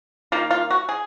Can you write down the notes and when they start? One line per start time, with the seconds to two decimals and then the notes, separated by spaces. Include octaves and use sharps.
0.32 D#3 A#3 F4
0.51 F4
0.70 F#4
0.89 G#4